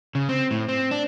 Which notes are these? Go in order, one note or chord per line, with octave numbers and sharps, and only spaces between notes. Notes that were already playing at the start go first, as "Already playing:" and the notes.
C#3
C4
A2
C4
D4